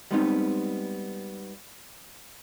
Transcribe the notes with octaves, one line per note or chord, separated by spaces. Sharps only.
G3 G#3 B3 C4 D4 D#4